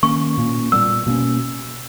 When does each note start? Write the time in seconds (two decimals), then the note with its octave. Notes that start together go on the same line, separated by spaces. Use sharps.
0.03 D#3 A#3 C#4 C#6
0.37 A#2 A#3 C#4
0.72 A#2 G3 B3 E6
1.06 B2 A#3 C#4